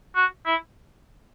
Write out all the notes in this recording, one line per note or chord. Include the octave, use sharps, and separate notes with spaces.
F#4
E4